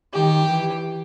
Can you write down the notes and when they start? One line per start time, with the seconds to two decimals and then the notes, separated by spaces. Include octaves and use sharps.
0.13 D#3 G4
0.46 E3